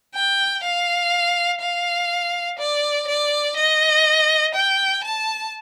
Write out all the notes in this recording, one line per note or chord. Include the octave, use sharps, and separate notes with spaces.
G5
F5
F5
D5
D5
D#5
G5
A5